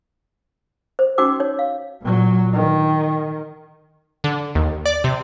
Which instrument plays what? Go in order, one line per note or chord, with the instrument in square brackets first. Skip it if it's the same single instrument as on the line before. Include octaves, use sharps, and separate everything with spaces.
[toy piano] C5
C#4 D#4 F#4 G5 D6 E6
D#4 C#5
F5
[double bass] A#2 F#3
D#3
[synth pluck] D3
D#2
D5
C3